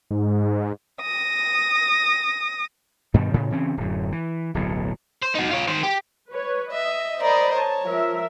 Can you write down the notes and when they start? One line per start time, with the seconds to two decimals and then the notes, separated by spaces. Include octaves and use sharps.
0.11 G#2
1.01 D#6 A#6
3.14 G2 B2 D#3 G3
3.34 A2 C#3
3.51 C#3 E3 C4 C#4
3.77 D1 F#2
4.12 E3
4.54 D1 B1 A2
5.22 C5
5.35 D#4 F#4
5.50 F4 C#5
5.68 D#3 C5
5.83 G4
6.32 B4 C#5
6.72 D#5 E5
7.21 A#4 C5 D5 D#5 B5
7.54 C#5 A5
7.85 F3 A#4 E5